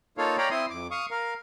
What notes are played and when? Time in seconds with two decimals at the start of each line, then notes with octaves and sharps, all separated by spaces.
0.18 A#3 D#4 F4 A4 C#5 F5
0.38 C#5 D5 F5 G5 A#5 B5
0.51 C4 E4 C6 D#6
0.70 F2 D6
0.91 F5 C#6 D#6
1.11 A#4 F5